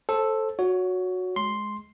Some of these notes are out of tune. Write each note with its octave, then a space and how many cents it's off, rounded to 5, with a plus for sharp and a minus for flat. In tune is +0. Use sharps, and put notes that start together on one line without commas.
A4 +0 C5 +25
F#4 -15 C#5 +15
G#3 +10 C6 +0